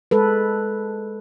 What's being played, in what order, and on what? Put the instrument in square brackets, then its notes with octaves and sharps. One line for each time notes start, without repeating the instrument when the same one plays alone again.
[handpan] G#3 A4 B4